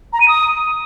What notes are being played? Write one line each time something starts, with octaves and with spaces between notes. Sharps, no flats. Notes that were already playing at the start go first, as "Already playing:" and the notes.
A#5
D#7
D#6